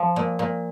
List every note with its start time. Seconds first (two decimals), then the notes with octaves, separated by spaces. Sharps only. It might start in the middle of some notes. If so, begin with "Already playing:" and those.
Already playing: F3
0.16 A#2
0.39 A#2